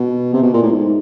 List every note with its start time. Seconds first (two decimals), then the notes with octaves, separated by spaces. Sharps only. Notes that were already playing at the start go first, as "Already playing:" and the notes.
Already playing: B2
0.34 C3
0.43 B2
0.53 A#2
0.63 A2
0.72 G#2